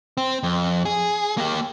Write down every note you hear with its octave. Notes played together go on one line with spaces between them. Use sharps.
C4
F2
G#4
A#3 G4